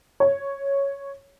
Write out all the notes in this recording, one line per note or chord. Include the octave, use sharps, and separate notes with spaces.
C#5